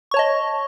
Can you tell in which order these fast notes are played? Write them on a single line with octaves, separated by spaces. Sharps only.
C#6 C#5 A5 D#5